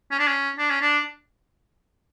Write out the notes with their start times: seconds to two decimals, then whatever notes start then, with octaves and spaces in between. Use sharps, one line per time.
0.11 C#4
0.19 D4
0.27 C#4
0.58 D4
0.70 C#4
0.81 D4